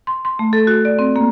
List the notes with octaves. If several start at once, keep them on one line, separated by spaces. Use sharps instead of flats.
C6
C6
A3
A4
F#4
D5
C4
A#3